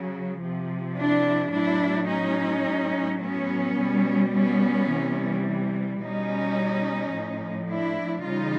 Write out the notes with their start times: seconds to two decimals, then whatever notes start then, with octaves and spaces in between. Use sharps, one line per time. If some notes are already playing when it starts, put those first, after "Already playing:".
Already playing: C#3 F#3
0.43 C3 F3
0.97 D4 E4
1.53 A2 F#3 D4 E4
2.09 C#4 D#4
2.65 A2 F#3
3.22 B3 C#4
3.78 B2 G3
4.33 B3 C#4
4.89 C3 E3 G3
6.00 B2 G3 C#4 D#4
7.13 A2 F3
7.69 D4 E4
8.24 C#3 E3 G3 D#4 F4